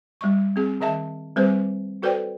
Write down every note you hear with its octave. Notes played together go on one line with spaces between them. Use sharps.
G3 D#5 C#6
C4 G#4
D#3 G#4 D#5 E5 A5
G3 C4 G#4 B4 C5
F#4 A4 B4 C5 D5 G5